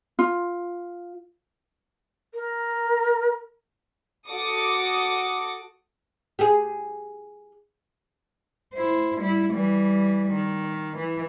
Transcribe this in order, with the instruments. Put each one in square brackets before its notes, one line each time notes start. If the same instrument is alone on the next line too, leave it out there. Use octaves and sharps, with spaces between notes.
[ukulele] F4
[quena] A#4
[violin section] F#4 A4 D6 D#6 C#7
[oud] G4 G#4
[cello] E4 C5
G3 E4
E3 G3
D#3
E3